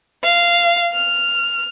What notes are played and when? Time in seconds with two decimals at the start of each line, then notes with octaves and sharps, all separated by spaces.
0.23 F5
0.92 F6